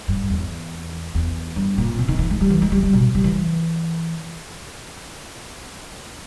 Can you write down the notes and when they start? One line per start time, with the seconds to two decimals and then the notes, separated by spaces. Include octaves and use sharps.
0.08 G2
0.30 E2
1.15 E2
1.56 G2
1.78 A#2
1.99 B2
2.08 D#3
2.19 E3
2.30 G#3
2.41 G3
2.50 E3
2.62 G#3
2.72 G3
2.83 G3
2.93 B2
3.15 G3
3.24 E3